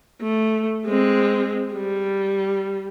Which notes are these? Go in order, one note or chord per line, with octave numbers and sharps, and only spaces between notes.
A3
G#3 C4
G3